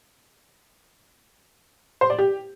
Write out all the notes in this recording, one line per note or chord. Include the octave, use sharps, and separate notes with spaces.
C5
D5
G4